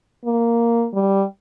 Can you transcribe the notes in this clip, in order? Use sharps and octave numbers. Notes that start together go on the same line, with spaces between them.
A#3
G3